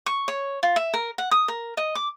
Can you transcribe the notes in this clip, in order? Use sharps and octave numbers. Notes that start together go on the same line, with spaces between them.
C#6
C#5
F4
E5
A#4
F#5
D#6
A#4
D#5
D6